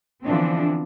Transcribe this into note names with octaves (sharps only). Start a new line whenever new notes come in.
D3 E3 F3 B3 C4 D4